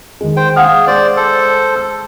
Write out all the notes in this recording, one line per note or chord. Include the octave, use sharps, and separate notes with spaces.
D#3 G#3
C5 G5
G#4 F5 F#5 F6
G#3 C5 D5
A4 C5
E6